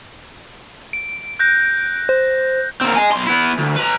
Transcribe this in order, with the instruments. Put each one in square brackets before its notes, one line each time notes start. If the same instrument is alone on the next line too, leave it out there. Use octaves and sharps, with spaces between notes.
[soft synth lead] D7
[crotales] F#6 G6 A#6
[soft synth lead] C5
[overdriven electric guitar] A#3 C4
D#5 G#5
B1 C6
B3 E4
D2
B4 A#5